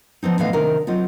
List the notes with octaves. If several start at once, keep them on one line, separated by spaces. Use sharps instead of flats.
F3 B3 C4 D#4
A2 D3 E3 B3 D#5 F5
C3 D#3 D4 A#4
F#3 C4 D#4 F4